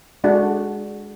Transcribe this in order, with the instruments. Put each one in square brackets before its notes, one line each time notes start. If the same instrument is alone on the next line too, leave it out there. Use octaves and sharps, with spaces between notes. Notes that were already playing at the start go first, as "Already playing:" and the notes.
[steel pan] G#3 D4 F#4 A4